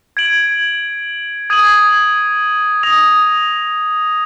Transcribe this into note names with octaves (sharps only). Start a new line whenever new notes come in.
G#6 D7 F#7
D#6 G#6 D#7 F#7
D#6 A#6 F7